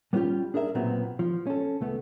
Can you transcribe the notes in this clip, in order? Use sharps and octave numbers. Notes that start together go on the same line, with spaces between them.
G3 B3 C#4 F4 G4
D4 G#4 A#4 E5
B1 A#2 F#3 B3 C4
F3
C#4 A4
C#2 A3 B3